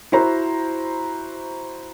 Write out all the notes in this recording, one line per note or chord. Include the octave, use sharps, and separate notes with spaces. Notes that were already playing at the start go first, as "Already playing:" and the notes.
E4 F#4 C5 A#5